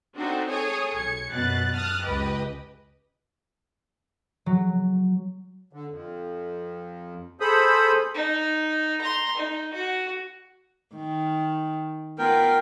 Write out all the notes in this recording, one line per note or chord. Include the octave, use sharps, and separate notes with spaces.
C4 D4 D#4 F#4 A4 C5
G#4 A4 C#5 G#5 D#6
B1 G#6 C#7
F#2 B2 F#6 A6
A5 D#6 F6 F#6 A6
C#2 G4 B4 D#5
F#3
D3
F2
G#4 A4 C5 B5 D#6
D#4
A#5 C6
D#4
F#4
D#3
B3 F4 A#4 G5